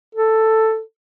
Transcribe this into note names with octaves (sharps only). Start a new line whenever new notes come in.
A4